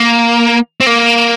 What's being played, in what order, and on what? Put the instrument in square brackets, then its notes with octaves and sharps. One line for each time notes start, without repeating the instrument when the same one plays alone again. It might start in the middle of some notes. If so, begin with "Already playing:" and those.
Already playing: [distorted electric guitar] A#3
C4
A#3